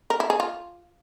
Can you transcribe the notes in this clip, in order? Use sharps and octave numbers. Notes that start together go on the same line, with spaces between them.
A#4
E4
G#4
F4